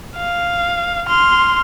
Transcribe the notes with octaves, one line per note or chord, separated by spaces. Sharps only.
F5
C6 F6